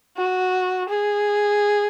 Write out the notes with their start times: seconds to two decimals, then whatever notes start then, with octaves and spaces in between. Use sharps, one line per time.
0.17 F#4
0.89 G#4